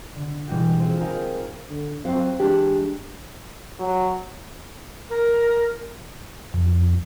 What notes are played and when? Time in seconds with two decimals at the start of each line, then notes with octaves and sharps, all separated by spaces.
0.15 D3
0.48 B2 E3 G3 G#3 F#4 G4
0.80 C4 F4 G#4
1.00 D#4 F4 G4 G#4 A#4
1.69 D3
2.05 F#3 C4 F5
2.40 E3 G#3 D4 G4
3.80 F#3
5.10 A#4
6.54 F2